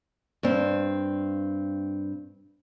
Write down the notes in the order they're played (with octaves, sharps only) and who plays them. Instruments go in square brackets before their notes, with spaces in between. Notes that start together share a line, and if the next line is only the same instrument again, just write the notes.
[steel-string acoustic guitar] G2 C4